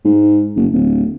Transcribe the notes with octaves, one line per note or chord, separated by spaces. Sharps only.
G#2
F#1
D1